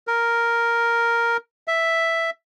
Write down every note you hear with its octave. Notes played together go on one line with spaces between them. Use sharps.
A#4
E5